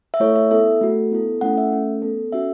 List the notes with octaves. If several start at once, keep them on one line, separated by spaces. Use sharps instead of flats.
E5
A3 E4 A4 C#5
E5
B3 E4 A4 E5
A3 F#4 A4
B3 E4 A4
A3 C#4 E4 A4 F#5
E5
A3 C#4 A4
B3 A4
C#4 F#4 A4 E5